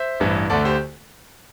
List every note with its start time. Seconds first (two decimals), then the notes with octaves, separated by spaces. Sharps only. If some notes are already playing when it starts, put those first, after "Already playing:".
Already playing: C5 E5
0.20 A1 G2 E3
0.50 D2 D3 A3 A4 D5
0.65 G4 C5